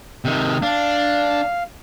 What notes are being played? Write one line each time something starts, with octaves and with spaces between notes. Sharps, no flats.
C3 D#3
D4 F5